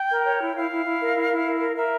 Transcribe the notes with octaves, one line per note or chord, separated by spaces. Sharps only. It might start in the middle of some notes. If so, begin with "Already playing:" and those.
Already playing: G5
A#4
C#5
E4
E4 F5
E4
E4
A#4
E4
E4
A#4
A#4
A#4 E5